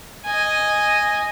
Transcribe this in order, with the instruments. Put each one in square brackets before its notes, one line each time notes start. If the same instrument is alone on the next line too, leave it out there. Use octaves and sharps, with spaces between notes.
[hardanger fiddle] D#5 G#5